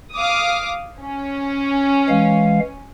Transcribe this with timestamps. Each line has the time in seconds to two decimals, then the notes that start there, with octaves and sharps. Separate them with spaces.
0.14 F5 D6 D#6
1.00 C#4
2.09 E3 G#3 F5